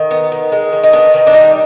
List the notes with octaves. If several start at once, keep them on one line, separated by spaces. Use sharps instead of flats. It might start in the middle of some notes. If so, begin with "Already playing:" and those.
Already playing: D#3
B3
D#3
G#3
D#3
D#4
B3 D4
D#3
D4
G3 D#4